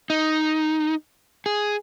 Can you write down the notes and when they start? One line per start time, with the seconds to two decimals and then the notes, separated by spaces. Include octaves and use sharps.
0.10 D#4
1.46 G#4